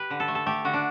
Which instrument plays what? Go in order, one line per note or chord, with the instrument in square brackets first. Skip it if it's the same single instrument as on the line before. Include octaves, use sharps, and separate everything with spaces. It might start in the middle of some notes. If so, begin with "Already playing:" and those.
Already playing: [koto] G4 B4
D3
A4
A3
A4
A3 G4
D3 F#4
D4